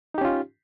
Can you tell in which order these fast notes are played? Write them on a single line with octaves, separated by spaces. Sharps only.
D#4 G4 C#4 F4